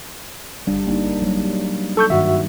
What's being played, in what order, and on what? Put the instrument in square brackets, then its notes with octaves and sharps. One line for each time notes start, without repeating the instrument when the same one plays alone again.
[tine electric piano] G1 [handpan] G3 D4
[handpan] A#3 D4 D#4
F#3 G3 A#3
[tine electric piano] A4 C#6 G6
[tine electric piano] G2 F#4 E5 [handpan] D#3